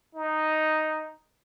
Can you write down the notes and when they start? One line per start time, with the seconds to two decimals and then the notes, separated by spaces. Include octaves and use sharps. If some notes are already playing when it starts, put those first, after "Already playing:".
0.15 D#4